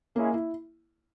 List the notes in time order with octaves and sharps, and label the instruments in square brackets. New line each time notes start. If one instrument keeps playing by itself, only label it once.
[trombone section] G#3 C#4 E4 G#4 [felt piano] A#3
[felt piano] E4